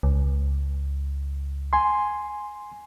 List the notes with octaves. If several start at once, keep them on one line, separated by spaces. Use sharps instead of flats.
C#2
G#5 C6